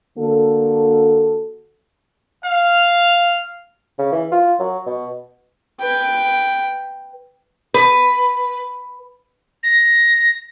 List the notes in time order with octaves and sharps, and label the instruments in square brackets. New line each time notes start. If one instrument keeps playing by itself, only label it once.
[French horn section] D3 A#3 F#4 A4
[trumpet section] F5
[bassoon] C#3
E3
F4
F#3
B2
[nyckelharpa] B4 G5
[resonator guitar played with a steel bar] B4
[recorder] A#6